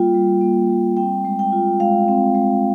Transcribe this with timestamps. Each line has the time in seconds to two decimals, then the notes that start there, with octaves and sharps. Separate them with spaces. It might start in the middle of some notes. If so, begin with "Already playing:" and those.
Already playing: G3 A#3 F4 G5
0.14 G3
0.41 A#3
0.70 G3
0.97 C4 G5
1.25 G#3
1.39 G5
1.52 F4
1.80 G#3 F5
2.08 C4
2.35 G#3